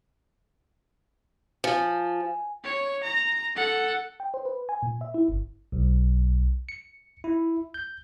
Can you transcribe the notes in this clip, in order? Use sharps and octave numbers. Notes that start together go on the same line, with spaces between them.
F3 G#5
C#5
A#5
A4 F#5
G5
C5
B4
G#5
A#2
E5
E4
G1
B1
C#7
E4
G6